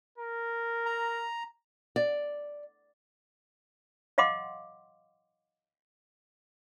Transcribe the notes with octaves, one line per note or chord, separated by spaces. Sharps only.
A#4
A#5
D5
D#5 F5 F#5 C6 D6